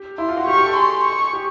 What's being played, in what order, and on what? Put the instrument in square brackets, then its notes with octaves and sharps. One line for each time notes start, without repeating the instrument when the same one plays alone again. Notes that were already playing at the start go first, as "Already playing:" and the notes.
Already playing: [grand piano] G4
[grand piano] E4 [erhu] C6
[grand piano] F4
F#4
[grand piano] G4 [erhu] C#6
[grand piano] G4
A4
[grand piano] G#4 [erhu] C6
[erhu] C#6
[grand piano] G4